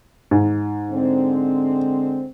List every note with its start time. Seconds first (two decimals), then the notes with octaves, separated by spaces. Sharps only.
0.31 G#2
0.91 D3 G#3 C4